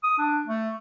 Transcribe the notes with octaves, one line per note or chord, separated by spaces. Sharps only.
D#6
D4
A3